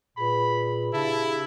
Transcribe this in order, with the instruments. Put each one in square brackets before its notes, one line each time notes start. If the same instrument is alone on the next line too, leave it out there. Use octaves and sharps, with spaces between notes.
[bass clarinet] A#2 [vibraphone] G#4 B4 [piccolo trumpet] B5
[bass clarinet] C#3 [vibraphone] D4 G4 [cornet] E4 [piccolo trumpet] A5